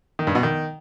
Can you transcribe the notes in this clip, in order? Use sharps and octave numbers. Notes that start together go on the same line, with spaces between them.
D#3
G2
B2
D#3